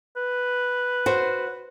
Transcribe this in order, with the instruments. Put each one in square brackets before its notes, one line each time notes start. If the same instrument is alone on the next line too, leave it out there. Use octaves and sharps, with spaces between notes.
[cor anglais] B4
[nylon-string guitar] F#4 C5